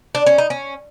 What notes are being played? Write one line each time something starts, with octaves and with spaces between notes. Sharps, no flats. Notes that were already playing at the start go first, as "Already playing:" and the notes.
D4
C#4
D#4
C#4